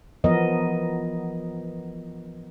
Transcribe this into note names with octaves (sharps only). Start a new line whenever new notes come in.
E3 F3 B3 A#4 D#5